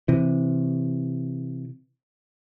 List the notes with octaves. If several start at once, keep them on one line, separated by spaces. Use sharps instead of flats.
C3 E3